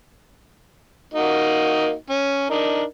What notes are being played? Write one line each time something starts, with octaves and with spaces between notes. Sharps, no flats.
A#3 D#4 F#4
C#4
D4 D#4 A#4